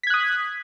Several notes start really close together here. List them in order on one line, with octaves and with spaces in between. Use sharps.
B6 G#6 F#6 D#6